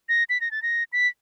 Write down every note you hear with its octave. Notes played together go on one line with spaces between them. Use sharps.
A#6
B6
A#6
A6
A#6
B6